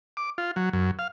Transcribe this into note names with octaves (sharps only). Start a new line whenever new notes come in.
D6
F4
F#3
F#2
F5